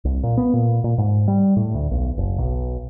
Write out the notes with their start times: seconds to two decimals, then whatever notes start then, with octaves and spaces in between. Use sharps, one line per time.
0.05 C2
0.23 A#2
0.37 B3
0.54 A#2
0.84 A#2
0.98 G#2
1.28 G3
1.57 A2
1.74 D2
1.91 B1
2.18 F#1
2.38 B1